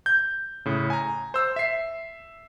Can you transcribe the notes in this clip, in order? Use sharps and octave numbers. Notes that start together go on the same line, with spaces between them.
G6
A2 C#3
G#5 A#5
C5 E6
E5 C7